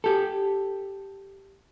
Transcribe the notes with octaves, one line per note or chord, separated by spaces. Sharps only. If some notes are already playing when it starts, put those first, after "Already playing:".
G4 A4